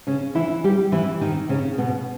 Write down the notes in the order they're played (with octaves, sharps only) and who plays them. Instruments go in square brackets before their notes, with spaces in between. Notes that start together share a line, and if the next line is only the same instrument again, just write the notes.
[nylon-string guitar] C#3 C#4
E3 E4
G3 G4
E3 E4
D#3 D#4
C#3 C#4
B2 B3